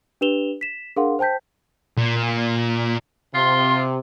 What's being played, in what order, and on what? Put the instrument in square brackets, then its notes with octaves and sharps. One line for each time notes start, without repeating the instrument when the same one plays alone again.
[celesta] D4 G4 B4 E7 F7 G7
B6 E7
D4 G#4 A#4 F5 F#5 C6
C5 G5 A5 G6 B6
[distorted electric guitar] A#2
[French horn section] C3 [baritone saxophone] F4 [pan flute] C6